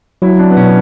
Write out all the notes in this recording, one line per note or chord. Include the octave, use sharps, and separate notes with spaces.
F#3 E4
D4
B3
B2 C#4